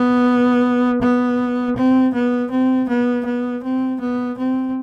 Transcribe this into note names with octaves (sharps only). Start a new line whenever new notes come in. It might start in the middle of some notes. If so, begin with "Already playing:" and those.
Already playing: B3
B3
C4
B3
C4
B3
B3
C4
B3
C4